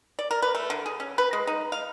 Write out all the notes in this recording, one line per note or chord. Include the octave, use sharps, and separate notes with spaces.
D5
A#4
B4
A3
D3
G#4
C#4
B4
G#3
D#4
F5